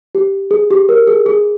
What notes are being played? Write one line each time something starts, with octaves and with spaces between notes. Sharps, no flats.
G4
G#4
G4
A#4
G#4
G#4